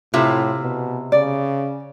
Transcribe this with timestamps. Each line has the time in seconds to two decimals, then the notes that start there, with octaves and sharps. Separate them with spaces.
0.14 A2 C3 E4 F4 E5
0.62 B2
1.12 C#3 D5